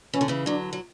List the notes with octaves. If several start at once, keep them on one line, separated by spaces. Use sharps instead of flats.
E3 C#4
D3
C#3 E3
D3 F#3 D4
F#3